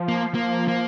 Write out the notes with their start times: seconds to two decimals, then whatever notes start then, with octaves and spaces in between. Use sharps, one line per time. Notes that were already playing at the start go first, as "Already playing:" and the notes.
Already playing: F3
0.09 A#3
0.35 A#3
0.68 A#3